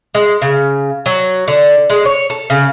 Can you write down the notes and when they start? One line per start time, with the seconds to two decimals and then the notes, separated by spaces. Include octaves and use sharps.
0.15 G#3
0.42 C#3
1.06 F#3
1.48 D3
1.90 G#3
2.05 C#5
2.30 A4
2.50 C#3